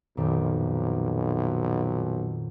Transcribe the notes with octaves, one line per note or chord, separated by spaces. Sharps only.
B1 F2 A#2 D#3